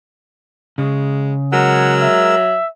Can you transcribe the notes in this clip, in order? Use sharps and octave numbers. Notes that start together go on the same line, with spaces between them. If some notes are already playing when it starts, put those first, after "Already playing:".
C#3 G#3
F#3 G#3 A#4 F#5 E6
E5